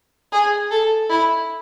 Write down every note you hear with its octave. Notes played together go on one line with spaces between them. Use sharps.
G#4
A4
E4